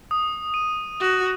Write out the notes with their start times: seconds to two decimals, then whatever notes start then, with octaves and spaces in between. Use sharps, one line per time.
0.11 D#6
0.54 D#7
1.00 F#4